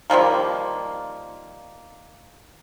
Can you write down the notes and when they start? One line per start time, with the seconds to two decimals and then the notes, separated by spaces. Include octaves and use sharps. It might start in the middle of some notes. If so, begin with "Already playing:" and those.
0.10 D#3 F3 G3 A#3